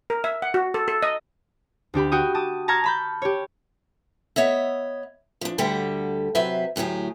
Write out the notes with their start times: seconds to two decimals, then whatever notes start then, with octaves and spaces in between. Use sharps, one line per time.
0.10 A#4
0.24 E5
0.42 F#5
0.54 F#4
0.74 A4
0.88 A4
1.03 D#5
1.94 D2 D4 G4 B5
2.11 F#4 G5 D#6
2.35 A5 D6 D#6
2.68 A5 A#5 C#6 F6 G#6
2.84 A5 B5 G6
3.22 G4 C#5
4.36 B3 C#5 D#5 E5
5.41 F3 D4
5.58 D2 D3 G3 A4 E5 G5
6.35 C3 F#3 B4 C5 E5
6.76 D2 A2 F#3 G4 G#4